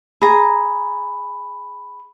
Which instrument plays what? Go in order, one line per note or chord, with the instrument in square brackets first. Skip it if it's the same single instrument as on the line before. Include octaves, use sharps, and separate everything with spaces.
[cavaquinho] G#4 A#5 [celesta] B5